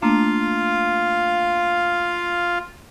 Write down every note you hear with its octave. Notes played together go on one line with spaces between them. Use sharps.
A3 A#3 D4 F4 F5